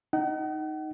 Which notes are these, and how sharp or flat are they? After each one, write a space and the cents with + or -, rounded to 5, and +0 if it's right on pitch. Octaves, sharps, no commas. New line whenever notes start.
D#4 +0 F#5 +40